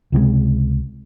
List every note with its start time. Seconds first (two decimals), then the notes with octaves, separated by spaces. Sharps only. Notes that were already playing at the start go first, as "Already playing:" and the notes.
0.12 C#2 C3 F#3 G#3